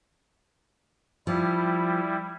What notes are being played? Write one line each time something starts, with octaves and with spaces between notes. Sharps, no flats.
F3 G3 E4